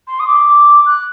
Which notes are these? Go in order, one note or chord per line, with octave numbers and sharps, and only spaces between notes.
C6
D#6
D6
F#6